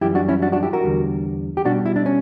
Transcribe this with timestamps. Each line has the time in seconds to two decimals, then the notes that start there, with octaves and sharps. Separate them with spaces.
0.01 F#2 E3 G3 E4 G4
0.15 D4 F#4
0.28 C#4 E4
0.42 D4 F#4
0.52 D4 F#4
0.63 E4 G4
0.73 F#4 A#4
0.84 E2 D3 G3
1.57 G4
1.65 B2 G3 D4 F#4
1.86 E4
1.96 D4
2.06 C#4